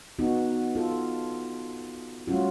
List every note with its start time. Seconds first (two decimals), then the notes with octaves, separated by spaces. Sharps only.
0.19 B3 D#4 F#4
0.75 F4 A4
2.27 G3 A3 C#4 F4 F#4